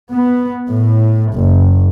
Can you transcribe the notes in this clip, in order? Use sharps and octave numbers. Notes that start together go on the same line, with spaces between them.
B3
A2
F#1